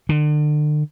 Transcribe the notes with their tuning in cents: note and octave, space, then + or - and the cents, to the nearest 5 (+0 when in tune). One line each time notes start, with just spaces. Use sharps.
D3 +40